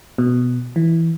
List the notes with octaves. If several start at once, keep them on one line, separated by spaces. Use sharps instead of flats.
B2
E3